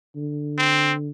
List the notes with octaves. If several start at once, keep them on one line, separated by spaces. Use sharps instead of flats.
D3
C4